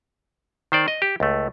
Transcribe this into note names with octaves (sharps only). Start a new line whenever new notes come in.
D#3 C5 D5
D#5
G4
C#2 A3